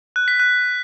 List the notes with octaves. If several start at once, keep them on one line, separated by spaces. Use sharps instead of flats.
F#6
B6
F#6